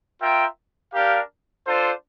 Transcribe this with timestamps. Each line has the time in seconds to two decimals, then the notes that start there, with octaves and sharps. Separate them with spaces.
0.19 F4 A#4 E5 G5
0.93 D4 G4 A#4 F5
1.66 D4 F4 A4 C5